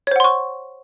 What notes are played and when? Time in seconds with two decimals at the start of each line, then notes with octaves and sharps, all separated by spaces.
0.07 C#5
0.11 C5
0.16 F#5
0.20 C6
0.24 C#6